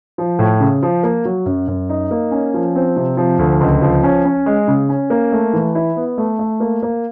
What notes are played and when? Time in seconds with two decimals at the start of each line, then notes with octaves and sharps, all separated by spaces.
0.18 F3
0.39 A2
0.60 C#3
0.82 F3
1.03 A#3
1.25 F#3
1.46 F#2
1.68 F#2
1.89 D#4
2.11 A#3
2.31 C#4
2.54 F3
2.75 C4
2.97 C3
3.17 F3
3.39 D2
3.61 C#2
3.82 F3
4.03 C#4
4.25 C#4
4.46 G#3
4.68 C#3
4.89 C#4
5.10 A#3
5.32 A3
5.53 E3
5.75 E4
5.96 B3
6.18 A3
6.39 A3
6.60 A#3
6.82 A#3